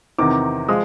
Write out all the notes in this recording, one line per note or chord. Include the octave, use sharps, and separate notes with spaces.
E2 C3 D#3 D6
F3 G#3 D#6